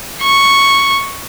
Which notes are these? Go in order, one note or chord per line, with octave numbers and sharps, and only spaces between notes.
C#6